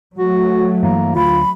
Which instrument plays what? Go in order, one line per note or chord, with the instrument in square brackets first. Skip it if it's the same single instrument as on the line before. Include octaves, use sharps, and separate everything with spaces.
[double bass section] F#3 A3 [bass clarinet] F#4
[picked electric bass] G2 E3 [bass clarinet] A#3
[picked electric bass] D2 [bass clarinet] F4 [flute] B5